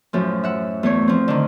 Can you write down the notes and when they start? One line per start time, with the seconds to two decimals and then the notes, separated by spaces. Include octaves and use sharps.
0.13 F#2 A2 F3
0.43 E5 F#5
0.83 E2 A3 C#5
1.08 F3 C4
1.28 D3 D#3